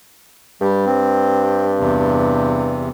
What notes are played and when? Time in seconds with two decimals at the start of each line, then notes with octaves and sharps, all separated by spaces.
0.61 G2 G3
0.86 C4
1.80 E2 C3